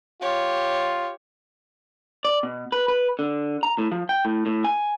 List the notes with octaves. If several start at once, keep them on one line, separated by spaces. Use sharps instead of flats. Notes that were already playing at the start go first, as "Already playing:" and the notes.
F4 G4 C#5
D5
B2
B4
B4
D3
A#5
A2
F3
G5
A2
A2
G#5